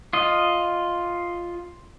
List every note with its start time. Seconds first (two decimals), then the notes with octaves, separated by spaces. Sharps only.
0.13 F4 D#5